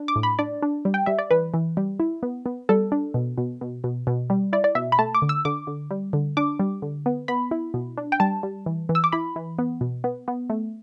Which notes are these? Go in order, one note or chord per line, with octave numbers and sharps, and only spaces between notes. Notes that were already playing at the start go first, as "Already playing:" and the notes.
Already playing: D4
D6
A2
B5
D4 D5
D4
G3
G5
G3 E5
D5
E3 B4
E3
G3
E4
B3
B3
G3 A4
D4
B2
B2
B2
B2
B2
G3
E4 D5
D5
B2 E5
B5
A3 A5
D6
D3
E6
D3 D6
D3
G3
D3
D4 D6
G3
D3
B3
B3 B5
E4
B2
D4
G5
G3 A5
G3
E3
E3
E6
D6
E4 B5
E3
B3
B2
B3
B3
A3